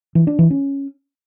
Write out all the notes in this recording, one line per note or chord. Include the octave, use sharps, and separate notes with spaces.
E3
D4
E3
C#4